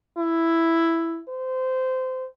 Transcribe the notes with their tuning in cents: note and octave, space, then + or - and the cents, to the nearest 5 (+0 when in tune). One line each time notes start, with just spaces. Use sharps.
E4 +5
C5 -20